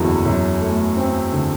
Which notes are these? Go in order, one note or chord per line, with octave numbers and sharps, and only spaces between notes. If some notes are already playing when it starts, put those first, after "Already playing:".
Already playing: F#1 E2 D3 F#3
F#2
A3
C4
D3